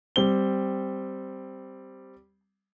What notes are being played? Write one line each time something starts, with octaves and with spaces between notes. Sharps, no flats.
G3 C4 G7